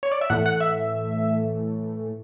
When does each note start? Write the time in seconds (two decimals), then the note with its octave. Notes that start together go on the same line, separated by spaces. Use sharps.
0.03 C#5
0.12 D5
0.21 E5
0.30 A2 E3 A3 F#5
0.46 F#5
0.60 E5